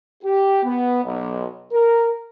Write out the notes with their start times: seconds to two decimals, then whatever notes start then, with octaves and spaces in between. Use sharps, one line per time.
0.24 G4
0.64 B3
1.04 B1
1.72 A#4